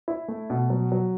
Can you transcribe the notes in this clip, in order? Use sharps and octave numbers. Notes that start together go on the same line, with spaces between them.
E4
A3
B2
F#3
F#3